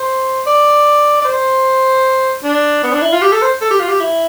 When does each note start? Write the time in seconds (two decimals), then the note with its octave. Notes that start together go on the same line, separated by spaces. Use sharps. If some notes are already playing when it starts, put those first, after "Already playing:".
Already playing: C5
0.47 D5
1.22 D5
1.25 C5
2.43 D4
2.83 B3
2.92 D4
3.02 E4
3.12 F4
3.22 G4
3.32 A4
3.42 C5
3.61 A4
3.70 G4
3.80 F4
3.89 G4
4.00 E4